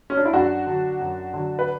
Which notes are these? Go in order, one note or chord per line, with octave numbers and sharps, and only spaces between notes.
C#4
D4
E4
F#2 D4 F#4
D3 F#3
F#2
D3 F#3
B4